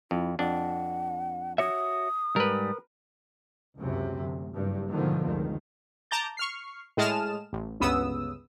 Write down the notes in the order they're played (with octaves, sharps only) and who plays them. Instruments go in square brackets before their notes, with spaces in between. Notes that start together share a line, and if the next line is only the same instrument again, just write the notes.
[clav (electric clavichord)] F2 [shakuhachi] E4
[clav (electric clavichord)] F2 D4 [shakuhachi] F#5
[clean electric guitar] F#4 C#5 E5 [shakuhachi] D#6
[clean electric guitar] G#2 G3 [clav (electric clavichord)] A#4 B4
[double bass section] C#2 F#2 C3
D2
F#1 G2
G#2 B2 D3 D#3 F3
F1 C#2 D#3
[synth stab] A5 A#5 D6 G6 A6
C#6 F6 C7
A2 G#3 A5 D#6 F6 E7
A1
G1 C#2 C#3 B3 D#6 E6